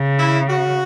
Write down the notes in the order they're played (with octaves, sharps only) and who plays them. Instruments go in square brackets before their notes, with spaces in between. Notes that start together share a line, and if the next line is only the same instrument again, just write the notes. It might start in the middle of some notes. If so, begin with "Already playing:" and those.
Already playing: [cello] C#3
[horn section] E4
F#4